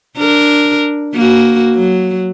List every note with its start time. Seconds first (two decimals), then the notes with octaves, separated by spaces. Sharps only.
0.18 D4 A#4
1.15 A#3 F#4
1.75 F#3